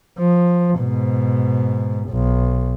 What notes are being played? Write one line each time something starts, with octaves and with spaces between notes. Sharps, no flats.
F3
G#2 B2
B1